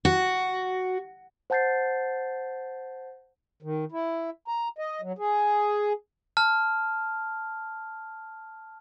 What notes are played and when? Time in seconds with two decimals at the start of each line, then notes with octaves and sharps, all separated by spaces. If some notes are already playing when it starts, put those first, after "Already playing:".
0.05 F#4
1.50 C5 F#5 A5 G6 A6 C7
3.62 D#3
3.92 E4
4.48 A#5
4.79 D#5
5.02 F#3
5.19 G#4
6.37 A5 F6